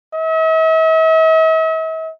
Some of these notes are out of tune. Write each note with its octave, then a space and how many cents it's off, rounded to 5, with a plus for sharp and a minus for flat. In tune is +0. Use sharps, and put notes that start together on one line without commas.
E5 -45